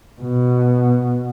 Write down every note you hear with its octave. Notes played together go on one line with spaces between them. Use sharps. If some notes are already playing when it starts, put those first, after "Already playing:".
B2